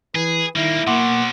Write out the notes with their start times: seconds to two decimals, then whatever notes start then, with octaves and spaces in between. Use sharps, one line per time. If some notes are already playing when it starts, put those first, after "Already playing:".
0.15 E3 G#4 B4
0.56 D#3 G3 A#3 E4
0.87 B2 F#3 A#3 F#5 C6 D6